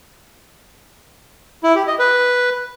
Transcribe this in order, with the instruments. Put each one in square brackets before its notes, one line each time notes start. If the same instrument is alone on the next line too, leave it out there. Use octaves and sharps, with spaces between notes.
[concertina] E4
G4
D#5
B4